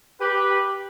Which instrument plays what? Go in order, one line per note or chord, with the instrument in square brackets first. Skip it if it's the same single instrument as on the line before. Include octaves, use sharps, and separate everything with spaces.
[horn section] G4 B4